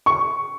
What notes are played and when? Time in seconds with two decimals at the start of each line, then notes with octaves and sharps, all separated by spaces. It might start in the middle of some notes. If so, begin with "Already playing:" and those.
0.06 C#6